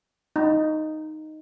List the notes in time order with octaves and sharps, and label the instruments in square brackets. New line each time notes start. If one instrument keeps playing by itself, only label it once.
[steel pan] D#4